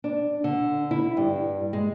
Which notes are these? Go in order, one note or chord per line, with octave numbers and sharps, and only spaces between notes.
D4
D3
E4
G2
G#3